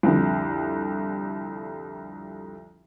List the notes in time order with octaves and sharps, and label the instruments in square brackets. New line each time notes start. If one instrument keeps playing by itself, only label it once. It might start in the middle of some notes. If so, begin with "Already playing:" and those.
[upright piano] C2 F2 D3